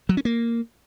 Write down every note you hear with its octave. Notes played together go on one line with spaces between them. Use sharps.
F#3
C#4
A#3